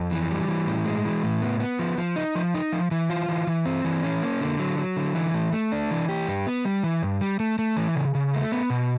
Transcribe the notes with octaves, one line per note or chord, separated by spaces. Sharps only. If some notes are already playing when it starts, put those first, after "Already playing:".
Already playing: F2
E3
G3
E3
A2
G#3
E3
A2
B3
B3
F3
F3
D#4
F3
D#4
F3
E3
F4
E3
E3
C4
E3
C#4
A#3
D3
F#3
F#3
D3
E3
A3
A3
D4
E3
G4
G2
B3
G3
E3
G2
G3
A3
A3
E3
C#3
C#3
A3
B3
B2